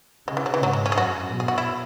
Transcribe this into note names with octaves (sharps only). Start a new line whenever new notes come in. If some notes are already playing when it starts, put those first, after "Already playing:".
C#3 G#3
E3
F#3
E3
G#2 F#3
G#3
C#4
G#4
F#2 F#4
B2
G#4
F#4
E4